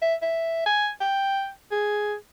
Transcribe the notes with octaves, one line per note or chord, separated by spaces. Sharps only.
E5
E5
G#5
G5
G#4